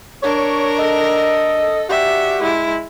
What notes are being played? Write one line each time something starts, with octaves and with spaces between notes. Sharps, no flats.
D4 A#4 C#5
A4 D#5
D4 F#4 G4 E5
G#3 E4